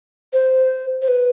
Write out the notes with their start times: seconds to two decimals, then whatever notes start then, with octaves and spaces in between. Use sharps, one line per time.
0.33 C5
1.02 C5
1.08 B4